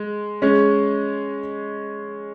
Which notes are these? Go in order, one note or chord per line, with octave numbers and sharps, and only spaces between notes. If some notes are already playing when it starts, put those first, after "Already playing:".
Already playing: G#3
G#3 C#4